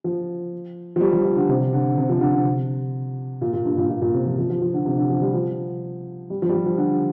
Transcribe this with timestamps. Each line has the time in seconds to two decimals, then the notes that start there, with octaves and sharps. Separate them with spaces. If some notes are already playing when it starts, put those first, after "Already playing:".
0.04 F3
0.96 F3
1.00 G3
1.13 F3
1.25 F3
1.37 D3
1.49 C3
1.73 D3
1.97 C3
2.09 F3
2.21 D3
2.33 C3
3.41 A#2
3.53 A#2
3.65 G2
3.78 A#2
3.89 A#2
4.01 A#2
4.13 C3
4.25 F3
4.38 F3
4.50 F3
4.62 F3
4.74 D3
4.85 C3
4.98 D3
5.10 F3
5.22 G3
5.34 F3
6.30 G3
6.42 F3
6.49 G3
6.54 F3
6.66 F3
6.78 D3